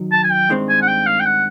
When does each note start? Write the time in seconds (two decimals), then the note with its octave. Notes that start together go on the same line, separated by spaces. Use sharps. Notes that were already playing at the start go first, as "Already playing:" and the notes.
Already playing: D#3 F#3
0.12 A5
0.24 G#5
0.31 G5
0.49 G2 D#3 G#3 C4
0.69 G#5
0.82 F#5
0.88 G5
1.06 F5
1.20 G5
1.25 F#5